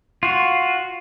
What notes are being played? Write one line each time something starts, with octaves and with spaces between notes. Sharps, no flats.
F4 F#4